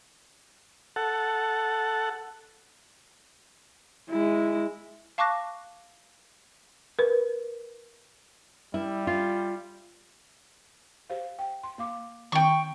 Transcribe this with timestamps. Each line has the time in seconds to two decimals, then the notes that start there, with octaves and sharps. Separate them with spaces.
0.96 A4 F#5
4.10 G#3 E4
5.18 F5 A5 C#6 D6 F#6 A#6
6.99 A#4 B4
8.74 G3 E4
9.07 F4
11.10 G4 C5 F5
11.39 G5
11.63 C6
11.78 A#3 F5 D6
12.32 D#3 C4 G5 A#5 C#6